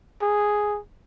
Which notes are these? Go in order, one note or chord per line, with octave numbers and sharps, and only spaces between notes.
G#4